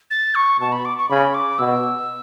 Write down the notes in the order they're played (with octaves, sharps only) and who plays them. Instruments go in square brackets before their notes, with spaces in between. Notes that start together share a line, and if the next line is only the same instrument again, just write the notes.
[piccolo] A6
C#6
[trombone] B2 [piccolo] A5
[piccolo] B5
D6
C#6
[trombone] C#3 [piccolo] B5
[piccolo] D6
[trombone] B2 [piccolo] E6